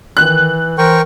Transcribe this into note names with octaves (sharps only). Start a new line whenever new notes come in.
D#3 E3 F#6
E3 A#4 C5 G5 C#6